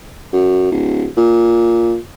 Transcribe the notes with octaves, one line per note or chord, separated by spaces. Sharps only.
F#2
D1
A#2